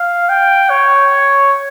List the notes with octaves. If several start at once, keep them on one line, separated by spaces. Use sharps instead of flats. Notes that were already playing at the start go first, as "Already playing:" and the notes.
Already playing: F5
G5
C#5